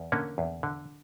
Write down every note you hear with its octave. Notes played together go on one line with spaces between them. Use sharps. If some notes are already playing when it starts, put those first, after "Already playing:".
Already playing: E2
D3 A#3 C#4
E2
D3